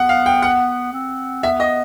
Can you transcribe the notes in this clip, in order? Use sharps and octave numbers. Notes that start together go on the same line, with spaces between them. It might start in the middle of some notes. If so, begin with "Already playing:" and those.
Already playing: B3 F#5
F5
G5
F#5
C4
B3 E5
D#5